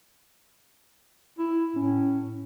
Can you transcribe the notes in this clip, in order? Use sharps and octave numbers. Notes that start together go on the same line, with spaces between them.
E4
A2 C#4